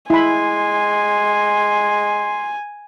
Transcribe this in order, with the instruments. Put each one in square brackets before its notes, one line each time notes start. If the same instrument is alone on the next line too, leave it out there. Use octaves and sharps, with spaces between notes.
[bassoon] G#3 [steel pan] E4 B5 [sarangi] G#5 [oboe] C6